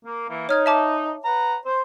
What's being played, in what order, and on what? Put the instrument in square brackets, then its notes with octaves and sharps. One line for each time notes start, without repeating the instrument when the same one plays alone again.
[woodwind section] A#3
E3 A#3
[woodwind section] D#4 [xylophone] C#5 F6 G#6
[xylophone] E5 A5 D6
[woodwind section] B4 F#5 A#5
C5